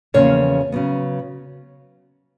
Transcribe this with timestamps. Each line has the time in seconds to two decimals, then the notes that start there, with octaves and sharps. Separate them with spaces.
0.14 E2 C#3 F3 A#3 C#4 C#5
0.72 C#3 F#3 B3